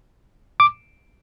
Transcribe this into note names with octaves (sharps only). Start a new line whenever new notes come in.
D6